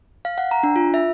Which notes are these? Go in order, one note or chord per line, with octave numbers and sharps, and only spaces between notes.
F5
F#5
A#5
D4
F4
E5